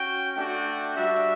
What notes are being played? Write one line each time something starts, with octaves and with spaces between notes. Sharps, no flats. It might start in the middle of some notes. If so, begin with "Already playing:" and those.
Already playing: C#4 F#4 G5
A3 D4 F#4 G5
G3 D4 F#4 E5